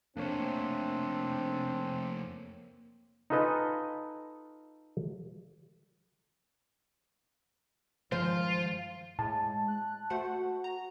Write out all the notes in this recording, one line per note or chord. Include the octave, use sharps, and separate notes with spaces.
F2 A3 A#3 C4 D4 A#4 C#5
D#4 F4 A4 B4 D#5 G#5
G2 D#3 F3 G#3 F4 C5
A2 G#3 A5
F#6
A3 F#4 C5 F#5
A#5